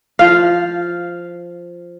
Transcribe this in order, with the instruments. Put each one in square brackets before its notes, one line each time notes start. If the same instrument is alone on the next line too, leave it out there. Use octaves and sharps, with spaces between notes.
[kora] F3 F5